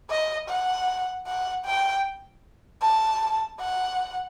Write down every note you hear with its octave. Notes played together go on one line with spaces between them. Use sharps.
D#5
F#5
F#5
G5
A5
F#5